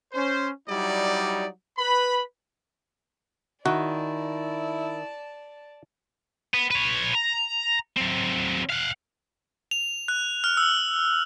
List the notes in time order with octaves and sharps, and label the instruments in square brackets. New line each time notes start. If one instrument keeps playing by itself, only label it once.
[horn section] C#4 C5
F#3 G3 D#4 E4 D5
B4 B5
[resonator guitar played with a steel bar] D#3 [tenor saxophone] E4 [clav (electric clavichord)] F#4 [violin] D5 A5
[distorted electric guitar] B3
B4 C#5
A#5
F#3 C4
F5 F#5
[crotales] F7
F#6
F6
E6